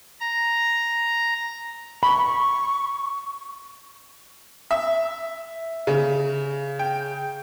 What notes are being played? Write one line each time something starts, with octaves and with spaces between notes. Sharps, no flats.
A#5
B5 C#6
E5
C#3
G5